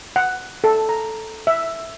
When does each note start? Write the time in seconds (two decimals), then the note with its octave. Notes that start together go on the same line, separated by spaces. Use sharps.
0.16 F#5
0.64 A4
0.89 A#5
1.47 E5